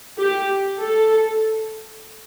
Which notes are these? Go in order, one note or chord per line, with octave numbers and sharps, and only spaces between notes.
G4
A4